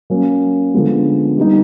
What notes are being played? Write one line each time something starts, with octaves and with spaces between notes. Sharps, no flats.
F#3 A#3 C#4
D3 F3 G#3 B3
G3 B3 D#4